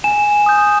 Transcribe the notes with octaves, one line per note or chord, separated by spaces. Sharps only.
G#5 E7
D#6 G6